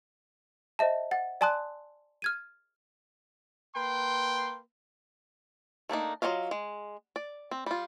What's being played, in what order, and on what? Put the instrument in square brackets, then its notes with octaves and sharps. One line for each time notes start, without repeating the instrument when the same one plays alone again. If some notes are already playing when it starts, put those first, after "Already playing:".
[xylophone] C5 D#5 E5 A5
F#5 A6
D5 G#5 A5 C6 D#6 F#6
F6 G#6 D#7
[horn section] A#3 B4 G5 C6
[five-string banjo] A3 A#3 D4 D#4
F#3 C#4 F4 D#5 F5
G#3
D5
C4
G3 F4